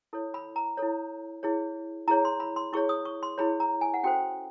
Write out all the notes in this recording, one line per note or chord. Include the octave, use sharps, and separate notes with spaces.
E4 A4 C#5
B5
A#5
E4 A4 C#5
E4 G#4 C#5
E4 G#4 C#5 A#5
C6
B5
C6
E4 G#4 C#5 C#6
D#6
C#6
C6
E4 G#4 C#5 B5
A#5
G#5
F#5
C#4 F#4 A4 C5 G5